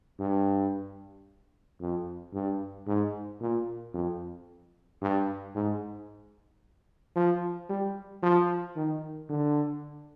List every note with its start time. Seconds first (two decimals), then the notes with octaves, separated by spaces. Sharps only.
0.20 G2
1.80 F2
2.34 G2
2.87 G#2
3.41 A#2
3.94 F2
5.02 G2
5.55 G#2
7.16 F3
7.69 G3
8.23 F3
8.76 D#3
9.29 D3